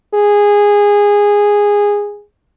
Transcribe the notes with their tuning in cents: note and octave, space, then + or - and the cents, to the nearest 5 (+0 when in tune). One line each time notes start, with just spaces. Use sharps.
G#4 -15